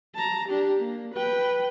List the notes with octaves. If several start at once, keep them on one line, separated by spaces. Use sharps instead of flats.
A5 A#5
D4 G4
A#3
B4 G5